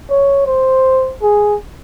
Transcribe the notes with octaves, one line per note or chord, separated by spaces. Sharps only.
C#5
C5
G#4